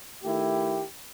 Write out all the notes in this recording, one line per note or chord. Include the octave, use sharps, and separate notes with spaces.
D#3 A3 E4 G4